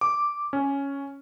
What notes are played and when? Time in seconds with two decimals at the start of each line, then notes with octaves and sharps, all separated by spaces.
0.01 D6
0.53 C#4